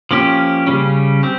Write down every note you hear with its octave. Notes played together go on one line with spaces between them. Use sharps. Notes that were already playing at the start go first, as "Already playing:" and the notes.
F3 A#3 C#4 G4
C#3 G3 C#4
C4 G4